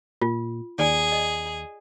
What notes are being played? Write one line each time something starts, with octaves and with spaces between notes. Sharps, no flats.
A#2 F4
D#2 G#4 D5 G#5
D#5